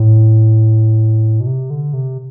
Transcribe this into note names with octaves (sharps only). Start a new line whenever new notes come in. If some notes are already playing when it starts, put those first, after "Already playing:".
Already playing: A2
B2
C3
D3
C3